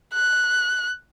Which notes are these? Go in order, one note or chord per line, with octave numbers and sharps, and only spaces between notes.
F#6